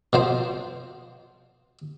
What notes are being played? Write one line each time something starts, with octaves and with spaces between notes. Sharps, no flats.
B2 F3 C5